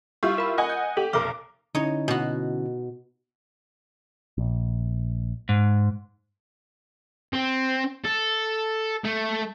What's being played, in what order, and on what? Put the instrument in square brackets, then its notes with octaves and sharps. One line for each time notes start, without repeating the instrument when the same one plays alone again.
[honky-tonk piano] G3 E4 F4 [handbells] C#6 G6
[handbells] A#4 B5
[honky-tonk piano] D#5 F#5 G#5
[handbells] G6
[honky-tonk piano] G4 [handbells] A4
[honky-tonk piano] F1 B1 A#4 [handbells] D6 F6
[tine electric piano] D3 C#4 E4 [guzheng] D#4 C#5
[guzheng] B2 F#4
[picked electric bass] A#1
[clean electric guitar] G#2
[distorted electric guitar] C4
A4
A3